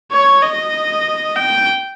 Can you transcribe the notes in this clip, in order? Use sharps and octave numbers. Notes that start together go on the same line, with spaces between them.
C#5
D#5
G5